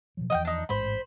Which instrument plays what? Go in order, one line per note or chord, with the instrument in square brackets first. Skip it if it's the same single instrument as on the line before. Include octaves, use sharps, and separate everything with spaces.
[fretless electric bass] B2 F3 F#3
[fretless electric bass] E2 E3 F3 [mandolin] D#5 F#5 G5
[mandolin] D4 D#4
[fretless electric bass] A1 G#2 G#3 [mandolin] C5 B5